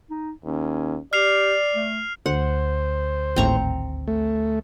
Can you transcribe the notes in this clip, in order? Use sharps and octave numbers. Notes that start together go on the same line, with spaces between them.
D#4
D#2 C#4
G4 D5 F6 C7 F7
A3
D2 C5 F#5
G#1 D#2 A2 C4 A#5 C#6
A3